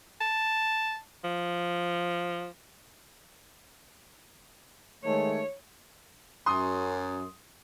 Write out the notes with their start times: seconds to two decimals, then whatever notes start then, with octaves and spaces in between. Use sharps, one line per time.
0.21 A5
1.24 F3
5.04 D#3 G#3 A3 C#5
6.46 F#2 C6 D#6